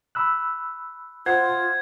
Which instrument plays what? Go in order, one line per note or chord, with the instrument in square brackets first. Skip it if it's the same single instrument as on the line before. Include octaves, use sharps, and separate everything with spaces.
[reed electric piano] B5 E6 F#6
[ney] F4 [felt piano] C5 F#5 [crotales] G#6